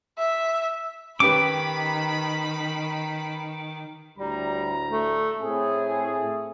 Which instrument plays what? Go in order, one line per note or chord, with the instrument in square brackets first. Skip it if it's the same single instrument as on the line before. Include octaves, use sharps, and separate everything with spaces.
[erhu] E5
[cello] D#3 [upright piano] C#4 G4 B4 [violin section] B5 [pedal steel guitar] D6
[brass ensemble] D2 A2 A#5 [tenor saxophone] G3
[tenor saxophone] A3
[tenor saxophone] A2 [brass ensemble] A3 C4 G#4